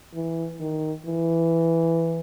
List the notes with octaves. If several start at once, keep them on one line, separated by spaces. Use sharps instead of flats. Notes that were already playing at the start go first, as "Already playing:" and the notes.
E3
D#3
E3